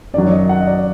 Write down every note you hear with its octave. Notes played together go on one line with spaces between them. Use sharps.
F#2 D#3 F#3 D5
D#5
F#5
D#5
D5